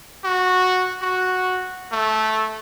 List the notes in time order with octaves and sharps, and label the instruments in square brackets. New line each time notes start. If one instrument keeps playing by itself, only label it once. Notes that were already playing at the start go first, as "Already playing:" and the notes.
[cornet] F#4
F#4
A3